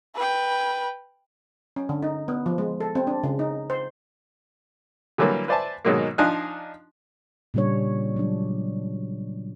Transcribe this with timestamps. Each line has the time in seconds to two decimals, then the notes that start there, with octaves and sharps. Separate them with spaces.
0.15 B4 G5
1.76 C#4
1.89 D3
2.02 D#4
2.28 B3
2.46 F3
2.58 G#3
2.80 A4
2.95 C4
3.07 D4
3.23 C#3
3.39 D#4
3.70 C5
5.18 D3 E3 F#3 G3 A#3
5.48 B4 C5 D5 E5 G#5 A5
5.85 G#2 B2 D#3 F#3 G#3 A#3
6.18 F3 D4 D#4 F5 G#5 F#6
7.54 A#2 C#3 G3 D4 C#5
8.16 F#3 G#3 D4